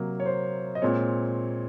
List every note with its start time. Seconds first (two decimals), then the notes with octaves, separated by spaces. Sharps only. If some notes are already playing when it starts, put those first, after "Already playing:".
Already playing: C3 F#3 A#3
0.20 C#5
0.26 C5
0.75 D#5
0.82 A#2 G#3 C4 C#5